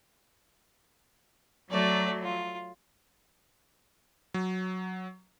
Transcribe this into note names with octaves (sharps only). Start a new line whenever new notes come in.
F#3 A3 D5
F4
F#3